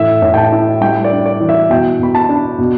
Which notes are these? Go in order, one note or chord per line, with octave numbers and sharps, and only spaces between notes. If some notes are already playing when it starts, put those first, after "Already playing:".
Already playing: A2 E3 E5
A2
G5
A5
E4
G3 G5
D5
D4
D5
E3
E5
B2 G5
B2 B5
A5
D4
B2